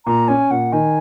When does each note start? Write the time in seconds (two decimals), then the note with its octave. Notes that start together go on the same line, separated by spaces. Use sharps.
0.06 A#2 A#5
0.28 C#4 G#5
0.51 A#2 F#5
0.72 D#3 G#5